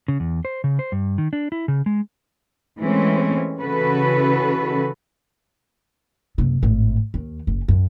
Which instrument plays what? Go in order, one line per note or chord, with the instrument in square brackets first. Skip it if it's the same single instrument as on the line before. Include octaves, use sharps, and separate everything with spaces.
[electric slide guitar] C#3
E2
C5
C#3
C5
G2
D#3
D4
E4
C#3
G#3
[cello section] E3 G#3 A3 C4 C#4
C#3 E3 C#4 F#4 A4 B4
[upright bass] F#1 C3
G#1 A2
D#2
F#1
F#2